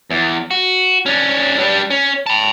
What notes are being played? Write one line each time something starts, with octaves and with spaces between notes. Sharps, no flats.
E2
F#4
C#4 D4
G3 D4
C#4
A5 B5